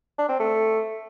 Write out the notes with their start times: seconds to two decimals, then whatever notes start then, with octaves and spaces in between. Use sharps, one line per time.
0.18 D4
0.29 C4
0.39 A3